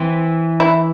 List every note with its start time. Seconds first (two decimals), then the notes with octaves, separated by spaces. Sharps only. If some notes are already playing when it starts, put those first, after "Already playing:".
Already playing: E3 C4
0.60 E4